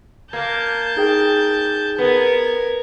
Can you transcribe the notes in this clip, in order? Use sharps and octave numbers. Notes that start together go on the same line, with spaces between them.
A#3 A5 G6 G#6
D#4 G#4 G5
B3 A#4 G#6